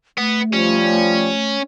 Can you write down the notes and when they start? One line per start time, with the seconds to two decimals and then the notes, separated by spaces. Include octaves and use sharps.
0.18 A3 B3
0.53 F3 G3 C#4